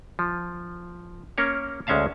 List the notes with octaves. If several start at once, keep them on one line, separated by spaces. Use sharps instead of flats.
F3
A#3 C#4 A#4 C#5
D2 G#3 C#4 E5 F5 A5